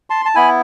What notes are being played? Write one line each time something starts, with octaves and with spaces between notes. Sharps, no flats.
A5 C6
A5
B3 E4 G#5 B5